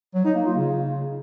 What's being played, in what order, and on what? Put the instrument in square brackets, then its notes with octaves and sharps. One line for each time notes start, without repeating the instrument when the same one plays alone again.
[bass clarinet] F#3
D#4
A#3
F4
C#3